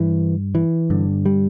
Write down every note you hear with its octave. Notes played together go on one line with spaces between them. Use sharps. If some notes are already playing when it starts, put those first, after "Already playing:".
Already playing: G2 E3
E3
G2 D3
G3